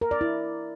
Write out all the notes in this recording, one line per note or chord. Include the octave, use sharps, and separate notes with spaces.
A#4
D5
E4